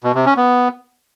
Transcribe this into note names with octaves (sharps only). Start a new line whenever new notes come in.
B2
C3
C#4
B3